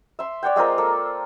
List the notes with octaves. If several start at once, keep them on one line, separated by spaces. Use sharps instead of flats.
E5 C6
C#5 D5 F#5 G5
G#3 C4 F4 A#4
A#3 A4